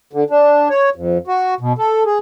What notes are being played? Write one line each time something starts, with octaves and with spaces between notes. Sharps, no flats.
D3
D4
C#5
F2
F#4
B2
A4
G#4